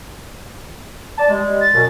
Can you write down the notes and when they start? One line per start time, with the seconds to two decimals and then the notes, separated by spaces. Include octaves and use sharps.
1.18 D5 A5
1.29 G3 G#3
1.61 A6
1.74 F#2 B2